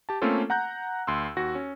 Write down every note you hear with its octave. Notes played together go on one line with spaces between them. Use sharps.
G4 A5
A3 A#3 C4 C#4 F4 A4
F#5 A#5 F#6 G6
D2 C6 E6
D#2 F#4 A#6
C#4